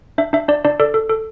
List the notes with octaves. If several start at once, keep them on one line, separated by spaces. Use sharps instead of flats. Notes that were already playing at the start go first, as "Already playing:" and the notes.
D4 E5
D4 E5
D4 D5
D4 D5
A4 D5
A4
A4